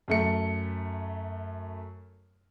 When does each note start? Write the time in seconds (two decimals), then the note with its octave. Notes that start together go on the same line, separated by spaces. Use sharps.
0.08 F#2 A3 C#7